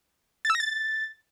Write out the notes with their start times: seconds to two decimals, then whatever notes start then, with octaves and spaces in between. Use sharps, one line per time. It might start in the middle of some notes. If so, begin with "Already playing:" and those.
0.45 A6
0.50 E6
0.55 A#6
0.60 A6